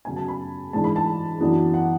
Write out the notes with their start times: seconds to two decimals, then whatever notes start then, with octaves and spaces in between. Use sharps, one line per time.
0.05 F#2 C#3 F#3 B3 G#5
0.16 A5
0.28 B5
0.73 G#2 E3 G#3 D4 A5
0.84 B5
0.96 A5
1.40 F#2 E3 B3 D4
1.74 F#5